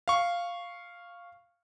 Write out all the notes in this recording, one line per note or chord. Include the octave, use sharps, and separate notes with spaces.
F5 C#6